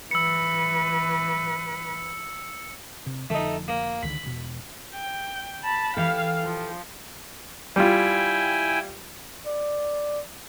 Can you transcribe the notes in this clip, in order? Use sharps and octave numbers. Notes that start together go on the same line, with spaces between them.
E3 B4 E6 C#7
C3
F1 D3 F3 A3 D#4
A#3
C#2 D3 D#3 B5
E1 B2
G5
A5 B5
E3 G4 A4 F5
F3
G3 E4 F4 G5 G#5
D5